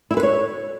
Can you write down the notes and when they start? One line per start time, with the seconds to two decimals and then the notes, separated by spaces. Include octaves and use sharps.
0.11 E4
0.17 B4
0.23 C#5